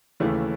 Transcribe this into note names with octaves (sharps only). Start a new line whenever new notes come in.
D#2 C#3 E3 A3